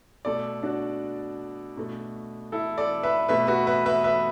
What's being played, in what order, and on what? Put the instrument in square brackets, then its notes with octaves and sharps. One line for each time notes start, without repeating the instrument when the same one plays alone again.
[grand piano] B2 A3 A4 D5
D4 F#4
B2 A3
E4 A4
A4 D5
B4 E5
B2 A3 B4 E5
F#4 B4
B4 E5
B4 E5
B4 E5